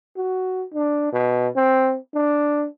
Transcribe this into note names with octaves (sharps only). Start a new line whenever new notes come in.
F#4
D4
B2
C4
D4